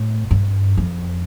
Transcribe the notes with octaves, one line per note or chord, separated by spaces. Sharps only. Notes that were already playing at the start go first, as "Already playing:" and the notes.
Already playing: A2
G2
F2